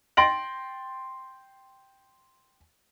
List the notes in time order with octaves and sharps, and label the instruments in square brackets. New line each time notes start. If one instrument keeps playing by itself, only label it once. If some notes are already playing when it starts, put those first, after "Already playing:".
[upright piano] G5 C6 A6 A#6 D7 F#7